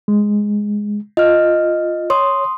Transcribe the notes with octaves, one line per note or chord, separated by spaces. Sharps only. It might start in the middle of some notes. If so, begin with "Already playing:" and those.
G#3
F4 D#5 F6
C#5 C6 D#6